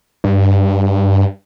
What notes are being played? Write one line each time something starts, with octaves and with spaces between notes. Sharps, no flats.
G2